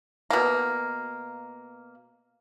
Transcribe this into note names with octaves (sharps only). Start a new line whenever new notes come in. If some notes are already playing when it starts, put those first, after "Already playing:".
B2 A#3